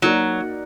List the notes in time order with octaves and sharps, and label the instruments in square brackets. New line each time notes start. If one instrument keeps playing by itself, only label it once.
[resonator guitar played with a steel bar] F#3 [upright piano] A#3 D#4 F#4 A#4 D5